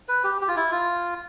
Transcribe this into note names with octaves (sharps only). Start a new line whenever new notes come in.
B4
G4
G4
F4
E4
F4